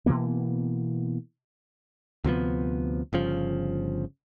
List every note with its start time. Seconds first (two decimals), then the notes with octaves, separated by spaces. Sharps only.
0.06 B2 E3 A#3 B3
2.24 D2 C3 F3 B3
3.13 G1 C#3 F3